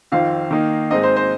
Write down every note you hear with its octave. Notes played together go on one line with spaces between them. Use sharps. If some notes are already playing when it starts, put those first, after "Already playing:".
F2 D#3 C4 F5
D#3 A#3 D#4
G#2 G#3 C4 D#4 D#5
C5
C5